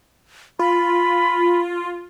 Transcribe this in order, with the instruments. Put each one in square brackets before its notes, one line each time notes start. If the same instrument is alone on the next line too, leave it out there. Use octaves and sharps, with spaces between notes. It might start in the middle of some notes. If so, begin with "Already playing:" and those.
[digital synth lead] F4 [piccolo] B5